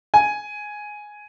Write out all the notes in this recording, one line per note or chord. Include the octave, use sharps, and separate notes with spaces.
G#5